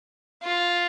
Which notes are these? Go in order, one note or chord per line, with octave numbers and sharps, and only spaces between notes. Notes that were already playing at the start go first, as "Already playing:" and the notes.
F4